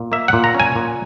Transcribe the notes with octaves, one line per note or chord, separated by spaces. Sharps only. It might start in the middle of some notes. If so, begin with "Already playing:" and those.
Already playing: A#2
A#3 E5
A#2 F#5
A#5
C#4
G#5
A#2